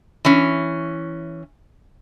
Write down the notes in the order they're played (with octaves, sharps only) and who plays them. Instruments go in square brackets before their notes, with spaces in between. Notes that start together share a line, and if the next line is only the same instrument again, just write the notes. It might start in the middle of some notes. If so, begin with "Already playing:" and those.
[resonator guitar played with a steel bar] E3 C#4